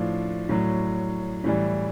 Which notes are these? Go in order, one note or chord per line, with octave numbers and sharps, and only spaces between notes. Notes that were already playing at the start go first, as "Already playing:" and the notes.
Already playing: A2 F3 D4
A2 F#3
A2 E3 G3